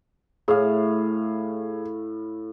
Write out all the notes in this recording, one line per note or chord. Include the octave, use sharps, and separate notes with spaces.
A2 G#4 F5